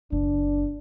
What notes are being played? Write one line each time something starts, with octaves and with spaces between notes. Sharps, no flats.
F#1 D4